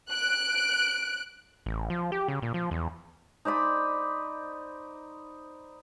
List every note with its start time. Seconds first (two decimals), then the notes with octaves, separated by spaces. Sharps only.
0.11 F#6 D7
1.66 A1
1.90 F3
2.12 G4
2.28 C#3
2.42 A#2
2.54 F3
2.71 E2
3.45 D#4 C5 D5 B5